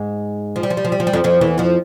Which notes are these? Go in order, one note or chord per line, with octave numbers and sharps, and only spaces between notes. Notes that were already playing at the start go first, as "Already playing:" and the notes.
Already playing: G#2 G#3
F3
G3
F3
G3
F3
G3
F3
G3
F2 F3
F2 F3
E2 E3
F2 F3